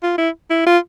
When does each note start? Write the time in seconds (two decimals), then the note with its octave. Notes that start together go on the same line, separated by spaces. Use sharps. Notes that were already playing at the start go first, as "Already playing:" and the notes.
0.03 F4
0.18 E4
0.50 E4
0.66 F4